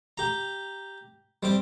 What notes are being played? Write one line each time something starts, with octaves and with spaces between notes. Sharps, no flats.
G4 A#5
G3 C4 D6